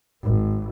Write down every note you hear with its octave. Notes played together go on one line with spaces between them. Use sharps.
G#1